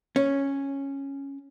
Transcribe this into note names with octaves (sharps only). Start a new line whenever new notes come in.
C#4